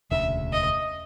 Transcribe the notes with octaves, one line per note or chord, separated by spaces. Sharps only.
E1 D2 C#3 E5
D#5